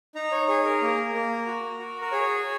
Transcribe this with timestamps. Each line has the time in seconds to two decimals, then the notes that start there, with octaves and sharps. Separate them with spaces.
0.15 D#4 A#5
0.32 C#5
0.48 G#4 C#5
0.65 A#4
0.82 A#3
1.14 A#3
1.47 F#4
1.79 F#4
2.01 A#4
2.12 G#4 C#5